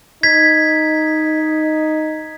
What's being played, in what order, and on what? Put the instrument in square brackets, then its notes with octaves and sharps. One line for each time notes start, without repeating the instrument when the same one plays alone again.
[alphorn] D#4 [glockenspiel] G#6 B6